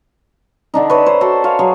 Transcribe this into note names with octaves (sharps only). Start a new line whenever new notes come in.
D3 D4 D#4
B4 C#5 E5
C5
F#4 A4 C5 D5
C#5 F5 G#5
F#3 G#4